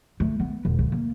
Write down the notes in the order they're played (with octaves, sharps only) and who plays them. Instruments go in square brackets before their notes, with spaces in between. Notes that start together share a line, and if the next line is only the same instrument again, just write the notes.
[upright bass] A3
B3
E1
D2
A#3